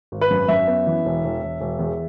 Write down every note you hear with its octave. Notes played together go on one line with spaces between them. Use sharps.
G#1
B4
F#2
F#2 E5
B3
E3
E1
E1
E1
E1
E2